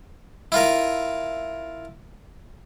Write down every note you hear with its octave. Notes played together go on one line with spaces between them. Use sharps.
E4 F4 A#4